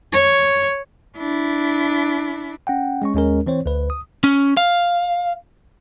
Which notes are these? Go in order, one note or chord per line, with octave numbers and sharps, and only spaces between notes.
C#5
D4 E4
C#4 F#5 G5
G#3 C#4 C#6
D#2 G#3 C#4 A#4
E3 C4 C5 C#5
D2 B4
D#6
C#4
F5